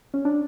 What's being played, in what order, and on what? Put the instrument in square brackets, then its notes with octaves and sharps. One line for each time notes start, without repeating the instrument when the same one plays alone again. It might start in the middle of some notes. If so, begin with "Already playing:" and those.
[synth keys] C#4
D4